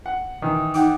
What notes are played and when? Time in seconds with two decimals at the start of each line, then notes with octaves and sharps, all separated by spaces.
0.06 F#5
0.42 D#3 E3
0.75 D#4 F#5 G5 D6